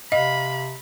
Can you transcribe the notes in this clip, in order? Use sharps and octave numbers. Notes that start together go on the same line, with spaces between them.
C3 D#5 F5 B5